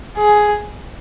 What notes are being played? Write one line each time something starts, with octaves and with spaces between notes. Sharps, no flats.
G#4